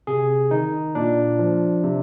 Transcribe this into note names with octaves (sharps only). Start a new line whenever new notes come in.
C3 G#4
D#3 D#4
A#2 D4
F3
C3